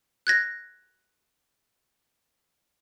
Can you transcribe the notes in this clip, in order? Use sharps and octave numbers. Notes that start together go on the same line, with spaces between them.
F#6 G#6 A#6